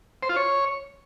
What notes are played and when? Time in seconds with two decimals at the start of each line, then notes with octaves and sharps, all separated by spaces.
0.23 C5
0.29 F4
0.36 C#5